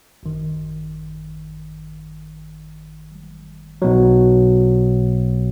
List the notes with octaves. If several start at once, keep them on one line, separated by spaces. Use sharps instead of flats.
G#1 F#2 D#3
B1 B2 F#3